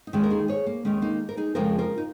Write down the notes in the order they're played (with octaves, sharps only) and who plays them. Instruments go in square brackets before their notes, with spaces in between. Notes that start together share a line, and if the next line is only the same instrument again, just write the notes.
[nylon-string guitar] D#4
D#2 D#3 G#3 C#4
A#4
D#4 G#4
G#4 C#5
A#3
D#2 D#3 G#3 C#4
A#3 D#4
A#4
D#4 G#4
F2 C#3 F3 G#3 F4 A#4
F4 A#4
D#4